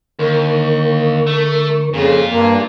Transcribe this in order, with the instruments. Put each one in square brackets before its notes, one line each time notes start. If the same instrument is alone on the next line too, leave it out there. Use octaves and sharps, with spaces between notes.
[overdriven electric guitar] D#2 [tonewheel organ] D3 A#4 C#6
[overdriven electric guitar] A3
[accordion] F2 C#3 [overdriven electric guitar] A#2 F4
[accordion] G2 A#3